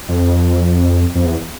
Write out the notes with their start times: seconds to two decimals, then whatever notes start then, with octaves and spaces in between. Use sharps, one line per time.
0.09 F2
1.15 F2
1.26 E2